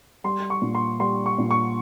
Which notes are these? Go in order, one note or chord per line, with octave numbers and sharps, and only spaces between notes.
G3 C6
C#6
A#2
C6
G3 C6
C#6
A#2
C#6